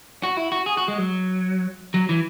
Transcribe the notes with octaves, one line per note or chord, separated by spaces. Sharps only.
F#4
E4
F#4
G#4
F#4
G#3
F#3
F#3
E3